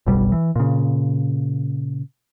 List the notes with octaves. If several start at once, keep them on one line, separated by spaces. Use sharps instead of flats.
F#1 B1 B2 G3
E3
A#2 C#3